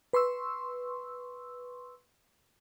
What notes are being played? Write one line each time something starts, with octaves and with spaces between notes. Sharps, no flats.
B4 C6 C#6 E6